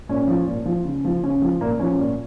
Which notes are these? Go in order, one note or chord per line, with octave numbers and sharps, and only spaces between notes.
A#2 C#4
F3
A#2
F3
C#3
F3
C#3 C#4
F3
A#2 A#3
F3 C#4
A#2